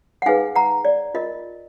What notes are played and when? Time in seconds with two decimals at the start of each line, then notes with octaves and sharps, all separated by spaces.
0.22 F#5
0.26 D#4 G#4 B4 F5 G#5
0.55 F#5 A#5
0.85 D5
1.14 F4 A#4 D#5